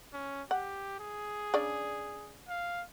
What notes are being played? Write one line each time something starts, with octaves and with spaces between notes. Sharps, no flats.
C#4
G4 F#5
G#4
C#3 D4 D5
F5